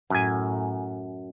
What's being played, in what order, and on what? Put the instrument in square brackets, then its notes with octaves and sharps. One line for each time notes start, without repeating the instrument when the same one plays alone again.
[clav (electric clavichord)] F#2 G#5 [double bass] A2